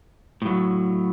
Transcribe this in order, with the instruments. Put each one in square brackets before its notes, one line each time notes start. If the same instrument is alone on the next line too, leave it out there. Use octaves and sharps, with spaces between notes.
[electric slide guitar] A2 F#3